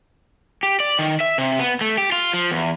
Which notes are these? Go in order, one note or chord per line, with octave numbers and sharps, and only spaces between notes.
G4
D5
D#3
E5
C3
B3
A3
G4
F4
F3
E2